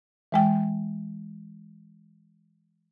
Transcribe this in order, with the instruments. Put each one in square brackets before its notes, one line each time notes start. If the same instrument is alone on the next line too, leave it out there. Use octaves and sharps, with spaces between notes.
[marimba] E3 G#3 G5